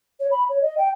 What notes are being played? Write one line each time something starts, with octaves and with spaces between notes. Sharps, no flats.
C#5
B5
C#5
D#5
G5